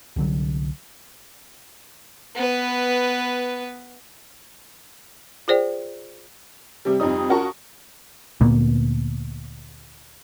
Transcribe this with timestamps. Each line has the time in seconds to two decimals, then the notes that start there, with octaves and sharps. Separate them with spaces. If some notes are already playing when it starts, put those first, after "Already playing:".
0.16 C2 D3 F#3
2.36 B3 B4
5.48 F4 G#4 C5 D5 G5
6.85 C3 G3
7.00 F2 G3 D#4 D#6
7.29 C#4 F4 F#4 A#4 A5 C#6
8.41 D2 A#2 A#3 B3